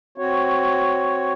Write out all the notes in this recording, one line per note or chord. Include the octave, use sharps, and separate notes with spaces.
C4 F#4 C#5